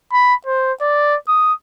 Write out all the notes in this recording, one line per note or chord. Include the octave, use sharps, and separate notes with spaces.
B5
C5
D5
D#6